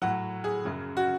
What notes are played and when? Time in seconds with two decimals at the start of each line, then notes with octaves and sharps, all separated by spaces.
0.02 A2 F#3 F#5
0.44 G#4
0.65 F#2 C#3 F#3
0.97 F#4